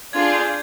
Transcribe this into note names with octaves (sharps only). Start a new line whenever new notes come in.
D4 F4 G#4 G#6
G6